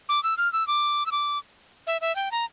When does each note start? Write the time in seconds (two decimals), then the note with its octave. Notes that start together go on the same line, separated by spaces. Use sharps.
0.09 D6
0.24 E6
0.38 F6
0.53 E6
0.67 D6
1.06 E6
1.12 D6
1.87 E5
2.01 E5
2.16 G5
2.32 A#5